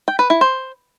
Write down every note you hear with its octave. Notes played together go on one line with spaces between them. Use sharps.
G5
B4
E4
C5